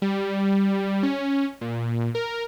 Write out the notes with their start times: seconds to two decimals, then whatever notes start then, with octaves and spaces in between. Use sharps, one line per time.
0.02 G3
1.03 C#4
1.61 A#2
2.15 A#4